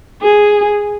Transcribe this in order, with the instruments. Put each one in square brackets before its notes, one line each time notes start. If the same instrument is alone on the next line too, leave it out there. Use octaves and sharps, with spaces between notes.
[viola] G#4